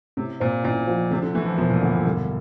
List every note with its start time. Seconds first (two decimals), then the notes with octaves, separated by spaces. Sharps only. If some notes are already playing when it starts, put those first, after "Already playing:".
0.17 A2 C3
0.40 A#2 C4
0.64 A1 A#2
0.87 F3
1.10 D2 C3
1.22 D3
1.35 E3 A3
1.46 F3
1.58 E1 F3
1.70 A#2
1.82 A2 D3
1.93 A#2
2.05 G2 D3